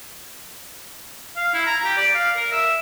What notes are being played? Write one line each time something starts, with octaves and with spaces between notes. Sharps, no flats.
F5
E4
A#5
G4
D5
F5
A#4
E5